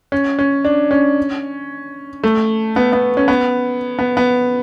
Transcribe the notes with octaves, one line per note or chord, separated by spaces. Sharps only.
C#4
C#4
D4
C#4
A3
B3
B3
C#4
B3
B3
B3